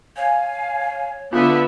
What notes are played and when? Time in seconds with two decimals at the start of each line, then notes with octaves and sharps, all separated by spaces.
0.17 C#5 F5 G#5
1.33 D3 B3 F4 E5